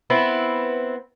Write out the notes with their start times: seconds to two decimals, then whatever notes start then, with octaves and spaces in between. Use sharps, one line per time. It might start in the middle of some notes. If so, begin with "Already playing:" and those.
0.10 B3 C4 E4